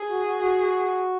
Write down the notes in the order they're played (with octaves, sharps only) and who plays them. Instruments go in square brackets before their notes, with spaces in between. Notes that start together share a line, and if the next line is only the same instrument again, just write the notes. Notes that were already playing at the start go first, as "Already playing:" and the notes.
Already playing: [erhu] G#4
[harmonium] F#4
F#4
F#4